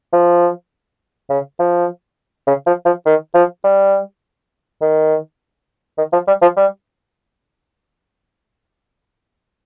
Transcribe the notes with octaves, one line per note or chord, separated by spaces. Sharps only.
F3
C#3
F3
C#3
F3
F3
D#3
F3
G3
D#3
D#3
F3
G3
F3
G3